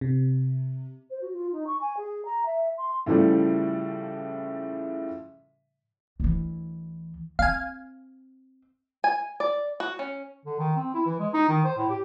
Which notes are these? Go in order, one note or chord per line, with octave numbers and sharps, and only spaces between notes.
C3
C5
F#4
F4
D#4
C#6
G#5
G#4
A#5
E5
C6
A2 C#3 E3 F3 G3 A3
D2 E3
C4 F5 G#5
G#5
D5
F#4
C#4
D3
D#3
C4
E4
E3
G#3
D#4
D#3
C5
A2
G4